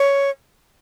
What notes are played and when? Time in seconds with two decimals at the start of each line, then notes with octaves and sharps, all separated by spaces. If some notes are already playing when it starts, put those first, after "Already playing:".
Already playing: C#5